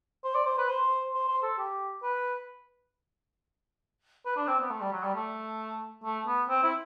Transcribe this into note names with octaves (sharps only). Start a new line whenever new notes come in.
C5
D5
C5
B4
C5
C5
C5
A4
G4
B4
B4
D4
C4
B3
A3
G3
F#3
G3
A3
A3
B3
C4
E4